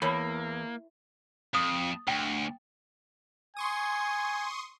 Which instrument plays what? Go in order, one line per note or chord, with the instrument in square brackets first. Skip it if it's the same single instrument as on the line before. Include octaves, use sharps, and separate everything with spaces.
[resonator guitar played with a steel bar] E2 [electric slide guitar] A#3 [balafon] A#4 C#5 B5
[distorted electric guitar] F2 [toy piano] D#6
[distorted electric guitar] D2 [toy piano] G5
[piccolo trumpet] G#5 [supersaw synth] C6 C#6 D#6